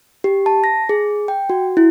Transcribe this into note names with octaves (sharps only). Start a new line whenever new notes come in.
G4
A5
A#6
G#4
G5
F#4
E4